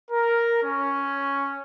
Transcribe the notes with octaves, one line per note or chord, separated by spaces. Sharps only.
A#4
C#4